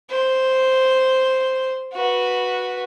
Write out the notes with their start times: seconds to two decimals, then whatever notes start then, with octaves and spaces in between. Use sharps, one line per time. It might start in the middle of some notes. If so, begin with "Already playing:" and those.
0.10 C5
1.93 F#4 B4